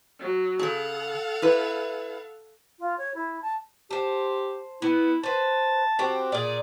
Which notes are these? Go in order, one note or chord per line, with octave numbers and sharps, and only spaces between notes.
F#3
C#3 G#4 A4 F5 F#5
E4 B4
F4
C#5
E4
A5
G4 C5 A5
B3 E4
B4 C5 A5
C4 F#4 G4
A#2 G#4 D5